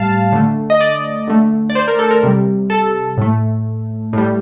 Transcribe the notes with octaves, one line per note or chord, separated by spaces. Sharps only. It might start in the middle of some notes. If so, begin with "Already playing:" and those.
Already playing: A2 G3 F5 A5
D3 A3
D#5
D5
D3 A3
D5
C5
A#4
A4
A#4
C3 G3
A4
A2 A3
A2 G3